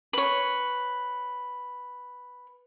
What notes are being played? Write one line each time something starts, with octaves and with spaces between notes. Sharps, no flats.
B4 C#5